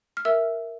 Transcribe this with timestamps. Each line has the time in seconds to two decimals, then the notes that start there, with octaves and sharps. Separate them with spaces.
0.17 F6
0.25 A#4 E5 E6